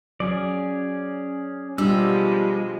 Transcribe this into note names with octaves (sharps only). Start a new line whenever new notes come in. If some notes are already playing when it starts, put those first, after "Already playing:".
F#3 C#4 G#4 D5
B2 F3 G3 G#3 D4 G4 E6